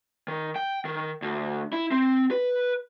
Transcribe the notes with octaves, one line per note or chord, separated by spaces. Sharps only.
D#3
G5
D#3
D2
E4
C4
B4